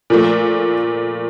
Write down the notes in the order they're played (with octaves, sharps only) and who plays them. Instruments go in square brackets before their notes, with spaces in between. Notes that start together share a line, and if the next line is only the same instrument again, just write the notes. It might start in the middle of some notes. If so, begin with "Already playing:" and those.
[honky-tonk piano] A#2 F3 A3